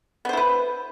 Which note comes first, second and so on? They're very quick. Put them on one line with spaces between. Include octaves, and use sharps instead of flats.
B3 C5 E4 B4